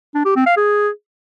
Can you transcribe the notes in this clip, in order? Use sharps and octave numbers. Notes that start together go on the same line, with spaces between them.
D4
G4
C4
F5
G#4